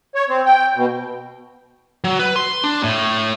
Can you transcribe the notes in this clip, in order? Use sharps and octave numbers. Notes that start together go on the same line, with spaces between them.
C#5
C4
G5
B2
F#3
B4
C6
D4
A2